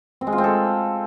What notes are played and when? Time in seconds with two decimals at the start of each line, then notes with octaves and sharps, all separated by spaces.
0.21 C4
0.27 G#3
0.33 F4
0.38 C4
0.44 A4